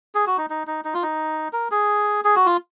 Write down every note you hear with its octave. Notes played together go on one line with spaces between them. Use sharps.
G#4
F#4
D#4
D#4
D#4
D#4
F4
D#4
A#4
G#4
G#4
F#4
F4